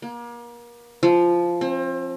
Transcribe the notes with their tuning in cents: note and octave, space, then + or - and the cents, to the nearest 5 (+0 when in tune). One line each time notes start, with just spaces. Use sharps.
A#3 +35
F3 -10
C4 +35